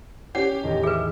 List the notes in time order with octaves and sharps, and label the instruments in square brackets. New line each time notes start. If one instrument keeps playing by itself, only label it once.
[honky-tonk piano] C#4 G4 [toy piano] F#5
[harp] E2 A2 D#3 [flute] D#5
[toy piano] G#4 B4 [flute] E5